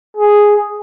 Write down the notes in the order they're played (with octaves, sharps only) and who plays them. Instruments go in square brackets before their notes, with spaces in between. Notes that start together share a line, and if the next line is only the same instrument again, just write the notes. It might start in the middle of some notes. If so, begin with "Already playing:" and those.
[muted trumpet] G#4